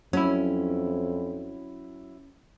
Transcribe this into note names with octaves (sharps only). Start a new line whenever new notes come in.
F2 F#3 C#4 E4